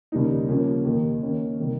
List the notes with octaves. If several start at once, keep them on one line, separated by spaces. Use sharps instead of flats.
D#2 C#3 G3 A#3 D#4
C#3 F3 A#3 C#4 G4
D#2 D#3 A#3
D#3 A#3 C#4
C3 D#3 G3